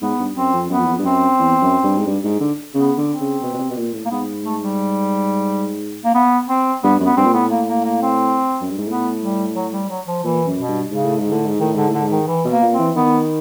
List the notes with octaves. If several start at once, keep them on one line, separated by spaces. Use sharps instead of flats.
G#2 B3
G2
F#2 C4
F2
F#2 B3
F2
E2
F2
G2
F#2 C4
E2
F#2
G2
G#2
G2
G#2
D3
C#3 B3
D3
C4
C#3
B2
B2
C3
B2
A#2
A2
A#3
G#2 B3
A3
G3
A#3
B3
C4
G2 B3
F#2
B3
G2 C4
A#2
A2 B3
A#3
A#3
A#3
C4
F#2
G2
G#2
A2 B3
G3
F#3
G3
F#3
F3
A#2 E3
F#2
B2
G2
G#2 C#3
A2
G#2
D3
A2
G#2
A2 D#3
G#2 D3
A2
D3
G#2
D#3
E3
B2
A#3
A#2
C4
E3
D#3 B3